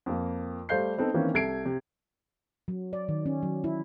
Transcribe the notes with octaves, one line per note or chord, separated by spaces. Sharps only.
F2 A#3
G3 A3 C5 F5 G6 C7
B3 C4 D#4 A4
D#3 E3 A#3 C4 C#4
C2 A4 G#6 C7 D7
C3
F#3
D5
D#3
C#4
F#3
E4